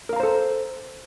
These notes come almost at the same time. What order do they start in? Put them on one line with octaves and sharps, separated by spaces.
A#4 F5 A#5 C5 A4